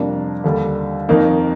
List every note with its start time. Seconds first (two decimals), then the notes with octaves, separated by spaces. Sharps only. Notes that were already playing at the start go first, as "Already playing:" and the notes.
Already playing: F2 C3 G3 A#3 D4
0.44 D#2 D3 G3
1.09 F2 D#3 A#3 D#4